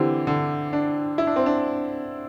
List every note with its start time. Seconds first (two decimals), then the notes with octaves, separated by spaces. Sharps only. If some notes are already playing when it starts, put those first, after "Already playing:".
Already playing: D3 E3 C4 E4 G4
0.27 D3
0.73 D4
1.18 E4
1.27 D4
1.36 C4
1.46 D4